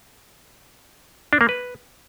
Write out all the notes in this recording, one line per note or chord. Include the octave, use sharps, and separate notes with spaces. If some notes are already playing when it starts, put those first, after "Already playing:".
D4
A#3
B4